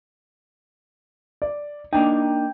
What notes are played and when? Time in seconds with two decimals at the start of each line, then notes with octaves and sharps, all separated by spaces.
1.42 D5
1.93 A#3 D4 D#4 G5